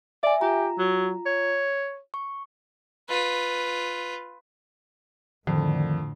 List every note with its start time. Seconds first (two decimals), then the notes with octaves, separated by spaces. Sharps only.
0.23 D5 E5 G#5
0.41 F4 G4 A#5
0.78 F#3
1.26 C#5
2.14 C#6
3.09 F4 B4
5.47 F2 A2 D3 D#3